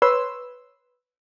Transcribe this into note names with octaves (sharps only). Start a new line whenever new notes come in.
B4 C#5 C6 E6